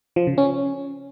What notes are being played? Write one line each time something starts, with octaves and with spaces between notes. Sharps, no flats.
F3
C#3
C#4